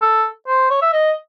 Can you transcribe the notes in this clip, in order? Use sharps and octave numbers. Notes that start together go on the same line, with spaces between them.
A4
C5
C#5
E5
D#5